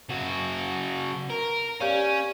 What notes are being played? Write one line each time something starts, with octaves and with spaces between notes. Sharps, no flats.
C#3 F#4
A#4
C#4 G4 D5 F5